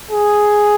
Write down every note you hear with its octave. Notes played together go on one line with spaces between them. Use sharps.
G#4